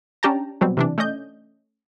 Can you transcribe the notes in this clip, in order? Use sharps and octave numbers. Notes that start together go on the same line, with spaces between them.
C#4 D4 G4 G5 A5 A#5
B2 F#3 G3 C4
C3 E3 D4
A3 C#4 D5 D#5 G6